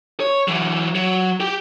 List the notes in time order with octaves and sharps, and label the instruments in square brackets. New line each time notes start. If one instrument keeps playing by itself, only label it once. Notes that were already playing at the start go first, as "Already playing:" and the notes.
[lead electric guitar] C#5
E3 F#3
F#3
G4 G5